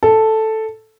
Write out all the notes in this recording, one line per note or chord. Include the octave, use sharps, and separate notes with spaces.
A4